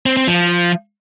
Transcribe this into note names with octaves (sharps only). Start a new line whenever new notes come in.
C4
C4
F3